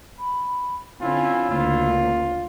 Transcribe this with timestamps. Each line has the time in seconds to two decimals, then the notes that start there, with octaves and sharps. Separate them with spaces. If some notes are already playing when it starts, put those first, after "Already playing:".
0.19 B5
1.01 D3 C4 C#4 E4 F4 G#5
1.50 D2 C#3 A#3 F4